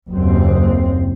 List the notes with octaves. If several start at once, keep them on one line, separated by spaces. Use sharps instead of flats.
F#1 D#2 C4